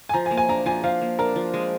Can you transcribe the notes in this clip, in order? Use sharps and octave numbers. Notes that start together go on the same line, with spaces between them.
G#5
F3 A#5
G#5
A#3
G#5
D4 A#5
F3 G#5
F3 F5
A#3
D4 A#4
F3
G#3